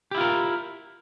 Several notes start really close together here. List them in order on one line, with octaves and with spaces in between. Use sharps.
G4 E4 F4 A#4